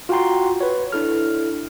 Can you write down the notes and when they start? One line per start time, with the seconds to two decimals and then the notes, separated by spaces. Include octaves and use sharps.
0.09 F4 F#4 F#5 G5 A#5 C6
0.61 B4 C#5
0.92 D4 E4 A4 F6